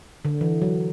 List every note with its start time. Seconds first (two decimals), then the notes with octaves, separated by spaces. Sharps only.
0.25 D3
0.41 E3
0.62 F#3